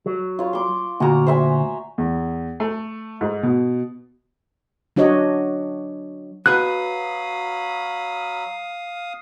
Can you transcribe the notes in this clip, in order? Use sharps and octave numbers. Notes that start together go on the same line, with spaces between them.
F#3
F4 C#5
C6 D6
D2 A#2 F#4 A#5
C5 E5 G#5
E2
A3
G#2
B2
F#3 D4 F#4 C#5 D#5
F#3 F#4 B4 F5 B5 D#6 F#6